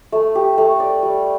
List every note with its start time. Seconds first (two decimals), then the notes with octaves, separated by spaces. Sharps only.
0.12 A3
0.35 G4
0.58 A3
0.80 D5
1.03 G3